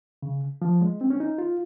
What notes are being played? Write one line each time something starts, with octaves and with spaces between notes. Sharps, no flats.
C#3
F3
G#3
C4
C#4
D#4
F4